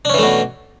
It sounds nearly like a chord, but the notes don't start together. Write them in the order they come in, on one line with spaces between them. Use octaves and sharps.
D4 C#4 E3 A3 B2